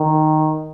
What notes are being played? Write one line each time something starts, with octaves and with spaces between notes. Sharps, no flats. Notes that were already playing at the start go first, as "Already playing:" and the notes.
Already playing: D#3